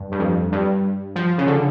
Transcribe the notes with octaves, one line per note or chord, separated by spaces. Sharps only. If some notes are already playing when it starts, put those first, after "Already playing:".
Already playing: G2
G2
F2
G2
F3
C#3
D3